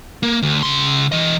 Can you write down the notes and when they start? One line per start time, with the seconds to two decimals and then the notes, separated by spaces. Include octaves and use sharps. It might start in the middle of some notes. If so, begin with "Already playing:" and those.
0.23 A#3
0.42 D2
0.63 C#3 C6
1.12 E3 D#5